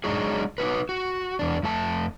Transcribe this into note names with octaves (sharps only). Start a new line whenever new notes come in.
F#3 G#3 D4 D#4 F#4 G#4
D#4 E4 F#4 B4
F#4
E2 D4
F2 A3 A5